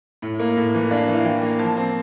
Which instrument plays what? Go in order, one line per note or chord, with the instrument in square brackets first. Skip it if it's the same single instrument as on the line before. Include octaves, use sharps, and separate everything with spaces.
[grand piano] A2
A#3
A2
E3
D4 F5
E3
F5
E3 G5
A#3
F3 A5
C4